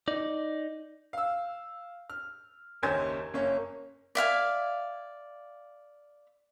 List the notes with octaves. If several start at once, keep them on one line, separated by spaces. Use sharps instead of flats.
D#4 D5
F5 E6
F6
F#1 D#2 C#4 C5 G#5 G#6
F#1 A#3 C#4 C#5
D5 E5 F5 G#5